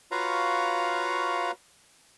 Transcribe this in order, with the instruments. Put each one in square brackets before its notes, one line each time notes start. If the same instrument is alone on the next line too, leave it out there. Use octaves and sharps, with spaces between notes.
[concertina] F4 F#4 B4 C#5 F5 A#5